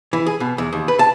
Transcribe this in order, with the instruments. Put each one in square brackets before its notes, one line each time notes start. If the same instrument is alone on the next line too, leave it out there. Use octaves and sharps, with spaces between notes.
[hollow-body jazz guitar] E3
G#4
B2
E2
D#2
B4
A5